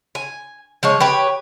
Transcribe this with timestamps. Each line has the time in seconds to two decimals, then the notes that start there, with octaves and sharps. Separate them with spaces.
0.15 G#5
0.83 F3 G#3 C#5
1.00 G4 B4 C#5